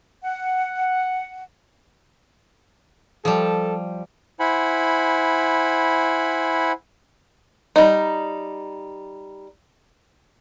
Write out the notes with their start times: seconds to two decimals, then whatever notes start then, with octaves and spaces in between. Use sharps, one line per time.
0.23 F#5
3.25 F3 G3 A4
4.40 E4 C5 F#5 G#5 B5
7.76 G3 D#4